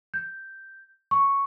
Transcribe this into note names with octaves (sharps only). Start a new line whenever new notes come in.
G6
C#6